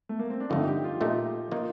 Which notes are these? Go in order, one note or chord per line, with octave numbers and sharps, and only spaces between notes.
A3
A#3
C4
D4
G1 F2 D3 A3 D#4
G4
F4
A#2 A3 D#4 G4
D#3 A#3 D#4 F4 A#4 D#5